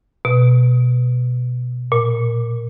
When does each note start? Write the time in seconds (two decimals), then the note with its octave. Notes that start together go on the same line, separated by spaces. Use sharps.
0.25 B2
1.92 A#2